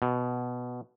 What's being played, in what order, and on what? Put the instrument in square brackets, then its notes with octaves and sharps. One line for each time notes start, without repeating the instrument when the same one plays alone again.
[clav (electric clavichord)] B2